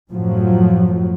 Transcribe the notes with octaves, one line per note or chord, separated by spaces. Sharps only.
F#2 A2 F3 F#3